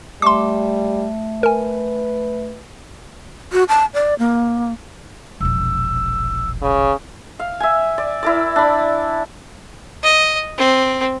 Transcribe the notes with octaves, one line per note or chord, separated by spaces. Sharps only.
G3 A3 E5 C6 D6
A#4 B4 G#5
F#4
A5
D5
A#3
E1 A#1 E6
C#3
F5
E5 G#5
D5
E4 A#4 D5
D4 B5
D#5
C4